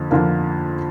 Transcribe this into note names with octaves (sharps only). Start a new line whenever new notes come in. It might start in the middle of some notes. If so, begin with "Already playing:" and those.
Already playing: F2 D3 F3 A#3
F2 D3 F3 A#3